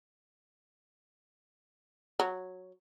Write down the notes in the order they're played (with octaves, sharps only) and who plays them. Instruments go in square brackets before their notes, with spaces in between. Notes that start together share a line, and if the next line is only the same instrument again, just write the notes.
[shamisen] F#3